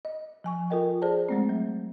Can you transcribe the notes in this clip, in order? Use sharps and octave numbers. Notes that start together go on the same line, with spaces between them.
D#5
F3 G#5 C#6
F4 A4 A#4 D#5 G5
G#4 C5 D5 A5
G#3 A3 C4
F#3